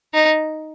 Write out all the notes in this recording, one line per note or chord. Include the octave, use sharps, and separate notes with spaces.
D#4